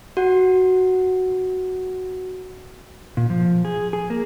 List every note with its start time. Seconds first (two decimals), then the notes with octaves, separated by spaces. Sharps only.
0.17 F#4 F#5
3.17 A#2
3.30 F3
3.65 G#4
3.93 G#4
4.10 A#3